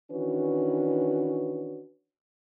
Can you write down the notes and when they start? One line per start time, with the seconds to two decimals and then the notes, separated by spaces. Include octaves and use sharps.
0.11 D#3 E3 C#4 D4 F#4 B4